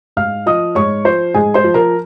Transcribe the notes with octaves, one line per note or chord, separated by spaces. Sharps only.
G#2 F5 F6
F3 D#5 D#6
G#2 C#5 C#6
F3 C5 C6
G#2 G#4 G#5
C5 C6
F3
A#4 A#5